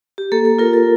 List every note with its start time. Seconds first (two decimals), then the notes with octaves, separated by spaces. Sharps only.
0.18 G4
0.32 A#3 A4
0.45 A4
0.59 F4 A#4
0.73 A4